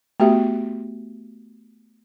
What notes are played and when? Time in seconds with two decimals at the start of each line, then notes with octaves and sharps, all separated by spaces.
0.20 A3 B3 F#4 G4 E5